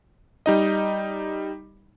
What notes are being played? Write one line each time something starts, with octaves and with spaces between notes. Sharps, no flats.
G3 D#4 D#5